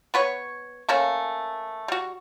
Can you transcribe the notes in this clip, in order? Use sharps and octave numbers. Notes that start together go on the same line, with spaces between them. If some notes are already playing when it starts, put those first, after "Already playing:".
B3 B4 C#5
A3 A#3 C#4 A4
G3 F#4